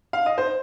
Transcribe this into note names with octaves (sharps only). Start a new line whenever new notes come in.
F5
D#5
C5